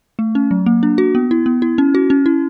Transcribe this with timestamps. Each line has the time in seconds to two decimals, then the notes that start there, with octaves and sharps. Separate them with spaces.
0.19 A3
0.35 C#4
0.51 F#3
0.66 A#3
0.83 D4
0.98 F#4
1.15 B3
1.31 E4
1.46 B3
1.62 E4
1.78 C#4
1.95 F#4
2.10 C#4
2.26 E4